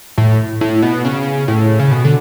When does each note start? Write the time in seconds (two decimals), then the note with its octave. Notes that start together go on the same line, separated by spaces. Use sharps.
0.18 A2
0.61 A2
0.82 B2
1.05 C#3
1.48 A2
1.79 C#3
1.91 B2
2.05 D3